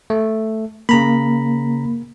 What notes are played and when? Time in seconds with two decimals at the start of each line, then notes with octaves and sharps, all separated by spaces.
0.10 A3
0.89 C#3 A#3 A#5 B5